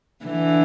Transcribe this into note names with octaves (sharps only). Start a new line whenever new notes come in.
D3 E3